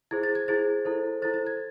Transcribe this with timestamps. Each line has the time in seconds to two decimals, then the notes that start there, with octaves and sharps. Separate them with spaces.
0.11 E4 G#4 C5 G#6
0.23 A6
0.35 G#6
0.48 E4 G#4 C5 A6
0.85 E4 A4 C5
1.22 E4 A4 C5 A6
1.34 A6
1.47 G#6